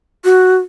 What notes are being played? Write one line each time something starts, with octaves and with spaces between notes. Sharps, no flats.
F#4